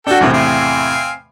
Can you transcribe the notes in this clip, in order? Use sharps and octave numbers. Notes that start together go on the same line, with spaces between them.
D4 F#4 A4 G5
E2 A2 C3 A#3 B3
C4 F5 G#5